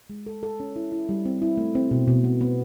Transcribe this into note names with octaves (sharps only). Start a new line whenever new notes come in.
G#3
A4
A4
C#4
E4
E4
G3
C4
E4
A3
C4
B2
B2
B3
B3